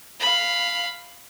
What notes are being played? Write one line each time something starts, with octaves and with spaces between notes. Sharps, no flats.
F5 B5